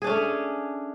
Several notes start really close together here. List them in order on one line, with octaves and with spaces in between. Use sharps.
G#4 D4 C#4 A3